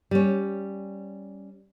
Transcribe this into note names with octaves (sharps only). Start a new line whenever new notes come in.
G3 C#4